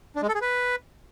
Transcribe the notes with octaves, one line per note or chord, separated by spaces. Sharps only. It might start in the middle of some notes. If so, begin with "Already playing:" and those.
D4
G#3
A4
G#4
B4